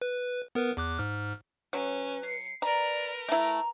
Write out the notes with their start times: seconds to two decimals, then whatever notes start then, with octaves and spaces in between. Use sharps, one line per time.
0.02 B4
0.55 B3 A#4 B4
0.77 E2 D6 F#6
0.99 G#2 F6
1.73 F#3 C#4 B4
2.25 C7 C#7
2.62 A#4 B4 D5 A#5
3.29 A3 E4 A#5